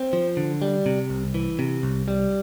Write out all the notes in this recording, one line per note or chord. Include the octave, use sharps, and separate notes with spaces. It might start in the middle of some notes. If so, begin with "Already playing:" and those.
Already playing: C4
F3
D3
G3
C3
C2
E3
C3
C2
G3